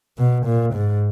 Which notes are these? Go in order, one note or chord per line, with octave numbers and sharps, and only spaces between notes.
B2
A#2
G#2